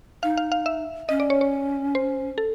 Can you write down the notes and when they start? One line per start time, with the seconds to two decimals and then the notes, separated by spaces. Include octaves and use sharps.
0.23 D#4 F5
0.37 F5
0.52 F5
0.66 E5
1.09 C#4 D#5
1.20 D5
1.30 C#5
1.41 C#5
1.95 C5
2.38 A4